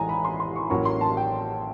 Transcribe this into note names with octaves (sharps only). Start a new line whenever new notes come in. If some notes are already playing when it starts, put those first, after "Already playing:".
Already playing: A1 A2 E3 G#3 G#5 A#5
B5
C6
C6
C#6
A1 A2 F#3 A#3 C#4 C#6
C6
A5
G5